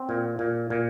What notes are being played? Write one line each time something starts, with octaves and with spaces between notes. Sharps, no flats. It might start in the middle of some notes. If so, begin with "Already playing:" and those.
Already playing: C4
A#2
A#2
A#2